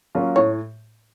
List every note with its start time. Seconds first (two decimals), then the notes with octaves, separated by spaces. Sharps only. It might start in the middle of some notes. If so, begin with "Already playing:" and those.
0.15 F#3 A#3 C#4 F4
0.36 A2 C#5